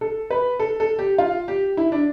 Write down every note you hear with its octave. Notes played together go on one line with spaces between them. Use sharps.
A4
B4
A4
A4
G4
F4
G4
E4
D4